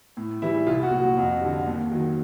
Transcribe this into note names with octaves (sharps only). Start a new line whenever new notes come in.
A2
E3 G3 E4
C2 F4
F#4
A#2 F#3
F#4
F2
D3 G3
D#2
D#3 F#3